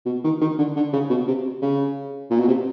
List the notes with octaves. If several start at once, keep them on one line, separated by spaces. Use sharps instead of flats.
B2
D#3
D#3
D3
D3
C#3
B2
C3
C#3
A#2
B2
C3